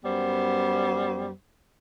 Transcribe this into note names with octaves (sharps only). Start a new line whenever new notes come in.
F#2 G3 B3 C5